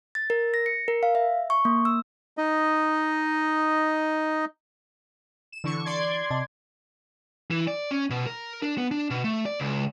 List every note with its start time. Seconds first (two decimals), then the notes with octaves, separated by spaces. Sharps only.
0.15 A6
0.30 A#4
0.54 A#6
0.66 C#7
0.88 A#4
1.03 F5
1.15 E5
1.50 C#6
1.65 A#3
1.85 E6
2.38 D#4 D#5
5.52 E7
5.64 D3 E3 C#6
5.85 D5 C6 G#6
6.31 C3 D#5 A5
7.51 E3
7.67 D5
7.91 C#4
8.10 B2
8.27 A#4
8.62 D4
8.78 B3
8.91 D4
9.10 B2
9.24 A3
9.46 D5
9.60 C#2